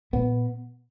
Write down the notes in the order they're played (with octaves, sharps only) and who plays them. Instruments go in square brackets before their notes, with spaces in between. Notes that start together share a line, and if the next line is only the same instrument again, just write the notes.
[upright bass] A#2 [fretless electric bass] B3